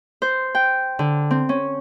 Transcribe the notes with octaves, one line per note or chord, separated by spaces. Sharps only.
C5
G5
D3
C4
C#4